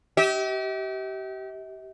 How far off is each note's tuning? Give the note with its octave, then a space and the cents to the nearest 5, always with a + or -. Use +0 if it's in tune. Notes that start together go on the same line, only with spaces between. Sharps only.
G4 -30 E5 -45